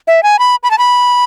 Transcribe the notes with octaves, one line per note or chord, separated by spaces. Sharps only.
E5
G#5
B5
B5
A5
B5